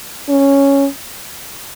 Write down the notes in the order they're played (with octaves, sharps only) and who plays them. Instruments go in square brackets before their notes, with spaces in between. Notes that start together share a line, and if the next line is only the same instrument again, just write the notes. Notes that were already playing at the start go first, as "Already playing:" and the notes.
[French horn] C#4